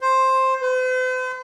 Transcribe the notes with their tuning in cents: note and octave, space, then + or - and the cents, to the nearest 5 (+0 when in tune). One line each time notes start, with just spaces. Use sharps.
C5 +10
C5 -45